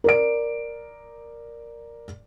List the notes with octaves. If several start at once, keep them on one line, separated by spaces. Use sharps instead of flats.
A#4 D5 D7